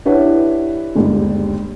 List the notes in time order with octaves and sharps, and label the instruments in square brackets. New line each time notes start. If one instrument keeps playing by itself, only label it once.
[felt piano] D4 E4 G4 B4 C#5 F#5
G1 D#2 G#2 G3